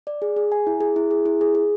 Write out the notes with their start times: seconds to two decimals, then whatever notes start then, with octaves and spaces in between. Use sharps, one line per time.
0.07 D5
0.22 G#4
0.36 G#4
0.52 G#5
0.67 E4
0.81 G#4
0.96 E4
1.11 G#4
1.26 E4
1.41 G#4
1.55 G#4